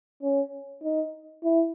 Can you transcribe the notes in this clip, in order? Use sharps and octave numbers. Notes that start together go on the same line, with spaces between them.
C#4
D#4
E4